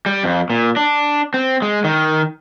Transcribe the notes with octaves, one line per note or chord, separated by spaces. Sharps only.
G3
F2
A#2
D4
C4
G#3
D#3